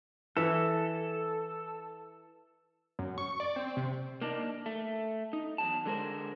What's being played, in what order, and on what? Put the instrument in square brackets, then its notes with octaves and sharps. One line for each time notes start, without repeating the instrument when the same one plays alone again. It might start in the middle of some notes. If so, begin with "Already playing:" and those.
[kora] E3 E5 [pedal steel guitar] A4
[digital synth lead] F#2
C#6
D5
C4
C3
[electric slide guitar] A#3 D4 D#4
A3
D#4
E2 F#3 A5
D3 G#3 A#4 C5